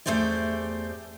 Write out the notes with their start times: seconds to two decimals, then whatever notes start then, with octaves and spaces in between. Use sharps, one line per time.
0.06 E2 C#3 A3 G4 C5 D5